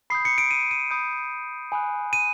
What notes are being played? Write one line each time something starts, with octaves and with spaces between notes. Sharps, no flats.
B5 D#6 G6 C7
C#7
D7
D#7
D#7
B5 D#6 G6
G#5 B5 D#6 F#6
D#7